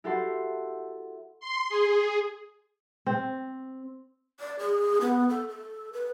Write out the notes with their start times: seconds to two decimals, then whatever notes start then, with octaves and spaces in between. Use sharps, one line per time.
0.04 E4 F#4 G4 A4 F#5 C6
1.40 C6
1.69 G#4
3.07 C4
4.40 D5
4.59 G#4
5.01 B3
5.29 A4
5.49 A4
5.93 B4